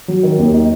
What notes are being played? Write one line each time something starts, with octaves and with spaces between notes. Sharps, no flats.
F#3
D#3
D#2
D#4